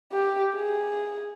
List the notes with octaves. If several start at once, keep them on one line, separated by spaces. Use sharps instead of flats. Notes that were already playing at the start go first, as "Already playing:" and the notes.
G4
G#4